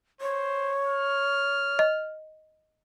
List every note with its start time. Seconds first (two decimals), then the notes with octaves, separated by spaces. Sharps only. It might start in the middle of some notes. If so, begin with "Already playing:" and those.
0.21 C5 C#5
0.87 F6
1.79 D#5